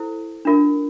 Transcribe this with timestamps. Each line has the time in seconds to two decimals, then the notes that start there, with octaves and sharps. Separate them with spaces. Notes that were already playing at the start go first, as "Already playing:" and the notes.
Already playing: E4 A4 C5
0.45 D4 F4 A#4